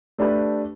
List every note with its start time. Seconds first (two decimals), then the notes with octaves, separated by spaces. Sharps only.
0.18 A3 D4 G4 B4